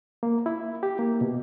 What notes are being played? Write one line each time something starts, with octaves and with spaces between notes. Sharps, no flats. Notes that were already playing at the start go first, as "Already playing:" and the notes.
A#3
E4
G4
A#3
B2